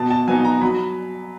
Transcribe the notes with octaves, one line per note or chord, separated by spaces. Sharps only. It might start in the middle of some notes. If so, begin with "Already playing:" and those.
Already playing: B2 A5
A5
F#3 B3 D#4 G#5
A#5
F#3 B5